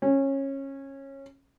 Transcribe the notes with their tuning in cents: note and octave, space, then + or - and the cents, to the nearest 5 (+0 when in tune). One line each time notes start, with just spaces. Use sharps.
C#4 -20